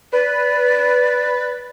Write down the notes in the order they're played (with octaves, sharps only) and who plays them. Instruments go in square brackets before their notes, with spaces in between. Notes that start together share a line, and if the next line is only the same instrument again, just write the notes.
[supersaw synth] B4 [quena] D5